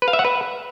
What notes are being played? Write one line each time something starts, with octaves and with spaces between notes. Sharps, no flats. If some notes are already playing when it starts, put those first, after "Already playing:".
B4
F5
E5
F#5
B4